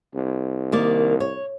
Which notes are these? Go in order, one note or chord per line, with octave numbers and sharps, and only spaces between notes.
C2
D#3 A#3 D5
C#5